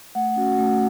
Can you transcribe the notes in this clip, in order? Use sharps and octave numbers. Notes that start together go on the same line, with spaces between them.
A3 F#5
C#4 F#4
A3